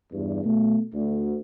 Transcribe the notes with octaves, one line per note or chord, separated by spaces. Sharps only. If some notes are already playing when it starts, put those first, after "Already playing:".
E2 G2
B2 A3
D2